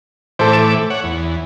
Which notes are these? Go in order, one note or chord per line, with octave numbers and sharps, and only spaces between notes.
A2 E3 A4 C5 D6
E7
C#5 F#5
E2